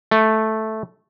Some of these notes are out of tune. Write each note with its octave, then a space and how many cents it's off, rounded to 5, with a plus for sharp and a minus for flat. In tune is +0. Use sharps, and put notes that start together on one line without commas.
A3 -5